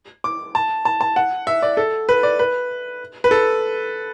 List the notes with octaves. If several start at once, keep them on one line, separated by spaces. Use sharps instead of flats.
D6
A5
A5
A5
F#5
E5
D5
A4
B4
D5
B4
B4
A4